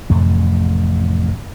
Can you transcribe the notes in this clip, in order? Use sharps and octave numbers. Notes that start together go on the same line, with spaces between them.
A1 F2 C3 A3